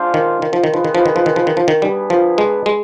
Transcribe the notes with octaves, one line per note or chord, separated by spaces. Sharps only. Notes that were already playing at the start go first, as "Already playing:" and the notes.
Already playing: G#3 D4 F4 C5 F5
D#3
D#3
F3
D#3
F3 F4 G#4 B4 D#5
D#3
F3
D#3
F3
D#3
F3
D#3
F3
D#3
G3 B3 D4 G#4 B4
F3
G#3
G#3